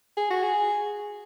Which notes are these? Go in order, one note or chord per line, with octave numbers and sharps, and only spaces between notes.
G#4
F#4
G#4